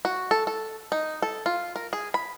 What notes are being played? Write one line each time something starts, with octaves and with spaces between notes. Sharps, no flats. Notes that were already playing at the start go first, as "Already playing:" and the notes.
F#4
A4
A4
D#4
A4
F4
A#4
G#4
B5